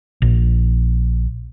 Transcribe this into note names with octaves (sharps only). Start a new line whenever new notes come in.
A#1